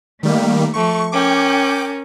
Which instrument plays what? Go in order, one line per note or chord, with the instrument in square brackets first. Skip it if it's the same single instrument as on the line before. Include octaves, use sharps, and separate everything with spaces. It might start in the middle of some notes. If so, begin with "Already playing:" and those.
[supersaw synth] D#3 G3 A#3 [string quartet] A3
[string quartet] F3 A3 [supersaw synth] C#6
[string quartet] C#4 A#4 [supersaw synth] G5 D6